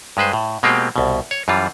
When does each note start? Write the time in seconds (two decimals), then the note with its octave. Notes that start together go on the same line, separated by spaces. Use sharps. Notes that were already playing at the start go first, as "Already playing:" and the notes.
0.17 G2 G#3 B4 C5
0.33 A2
0.63 B2 G#3 A#3 C4 F4 G4
0.96 C2 B2
1.31 C#5
1.48 F#2 E3 G3 F4